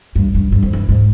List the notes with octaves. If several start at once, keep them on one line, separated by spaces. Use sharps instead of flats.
G2
G2
G2
F2
G2
G#2